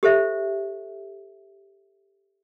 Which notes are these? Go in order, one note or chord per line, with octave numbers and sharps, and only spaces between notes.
G4 A4 C5 E5